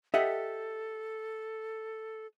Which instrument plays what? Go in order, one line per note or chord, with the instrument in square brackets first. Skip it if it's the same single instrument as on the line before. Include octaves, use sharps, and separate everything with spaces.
[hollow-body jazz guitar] G4 D#5 F#5 [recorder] A4 [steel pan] E5